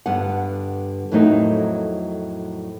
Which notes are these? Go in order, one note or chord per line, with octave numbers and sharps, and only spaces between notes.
G2 D3 B3 F#5
F2 A2 F#3 A3 D#4 A#4